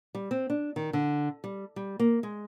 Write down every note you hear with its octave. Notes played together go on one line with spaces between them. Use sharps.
G3
C4
D4
D#3
D3
G3
G3
A#3
G#3